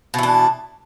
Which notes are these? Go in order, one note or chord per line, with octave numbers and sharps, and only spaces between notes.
B2 E3 D4